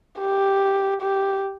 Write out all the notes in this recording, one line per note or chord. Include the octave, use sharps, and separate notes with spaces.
G4
G4